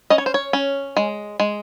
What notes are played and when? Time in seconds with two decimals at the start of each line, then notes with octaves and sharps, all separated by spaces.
0.10 C#4 D#5
0.18 C#5
0.26 C5
0.34 C#5
0.53 C#4
0.97 G#3
1.40 G#3